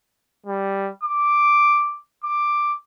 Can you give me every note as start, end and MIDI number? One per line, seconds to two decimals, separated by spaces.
0.46 0.90 55
1.04 1.99 86
2.24 2.74 86